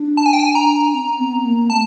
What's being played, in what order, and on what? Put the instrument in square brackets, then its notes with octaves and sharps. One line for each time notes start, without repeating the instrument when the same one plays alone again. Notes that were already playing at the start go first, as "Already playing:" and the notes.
Already playing: [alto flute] D4
[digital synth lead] A5
G#5
G5
G#5
A#5
[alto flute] C4
B3
A#3
[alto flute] A3 [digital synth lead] A5